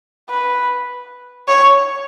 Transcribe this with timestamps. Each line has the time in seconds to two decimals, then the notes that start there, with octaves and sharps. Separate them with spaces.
0.30 B4
1.48 C#5